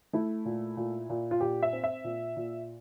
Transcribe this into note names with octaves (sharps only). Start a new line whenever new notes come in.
A3 E4
A#2
A#2
A#2
F4
A#2 G4
E5
C4
E5
A#2
A#2